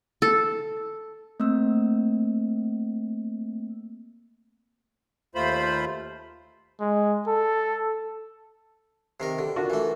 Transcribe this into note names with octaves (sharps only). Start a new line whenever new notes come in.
A4
A3 A#3 C4 E6
D#2 A3 F4 C5 B5
G#3
A4
C3 D#3 A#4
D3 G4
D4 F4 F#4 A#4
E3 A3